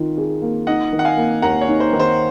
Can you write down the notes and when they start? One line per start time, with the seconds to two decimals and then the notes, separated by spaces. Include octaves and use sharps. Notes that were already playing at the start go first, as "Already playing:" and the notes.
Already playing: D#3 F4
0.17 G#4
0.42 A#3
0.67 D#4 D#5 F#5
0.93 D#3
0.99 F#5
1.05 F5 G#5
1.17 A#3
1.42 D#2 F#5 A#5
1.61 C#5
1.68 D#4
1.80 C5
1.93 D#3
2.00 C5